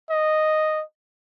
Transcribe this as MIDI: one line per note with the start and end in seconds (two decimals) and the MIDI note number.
0.10 0.83 75